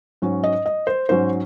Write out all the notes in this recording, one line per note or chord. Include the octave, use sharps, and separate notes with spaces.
G#2 F#3 C#4
D#5
D#5
C5
G#2 F#3 C#4 C5